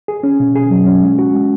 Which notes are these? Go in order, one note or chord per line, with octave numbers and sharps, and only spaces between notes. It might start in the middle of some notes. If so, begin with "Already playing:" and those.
G#4
C#4
B2
G#4
F#3
C#4
G#3
F#4
G#3